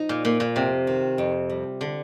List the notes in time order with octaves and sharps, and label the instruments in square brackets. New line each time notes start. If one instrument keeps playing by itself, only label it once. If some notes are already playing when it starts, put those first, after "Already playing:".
Already playing: [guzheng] F3 [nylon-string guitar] D#4
[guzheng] A#2
[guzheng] A#2 [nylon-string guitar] A#3
[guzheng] A#2
[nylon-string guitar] F2 [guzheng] C3
[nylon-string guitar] D#3
F2
G3
[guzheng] D3